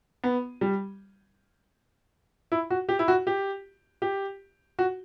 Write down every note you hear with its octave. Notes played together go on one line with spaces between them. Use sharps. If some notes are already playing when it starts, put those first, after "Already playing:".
B3
G3
E4
F#4
G4
E4
F#4
G4
G4
F#4